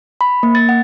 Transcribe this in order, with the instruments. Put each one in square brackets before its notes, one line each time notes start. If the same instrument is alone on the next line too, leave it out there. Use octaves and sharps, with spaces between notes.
[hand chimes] B5
A#3
A6
F#5